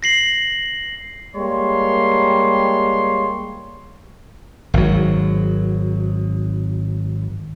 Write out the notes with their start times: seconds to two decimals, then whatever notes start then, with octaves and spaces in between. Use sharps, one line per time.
0.03 A#6 C7 F#7
1.36 G3 G#3 A#3 C#5 C6
4.74 G#1 F#3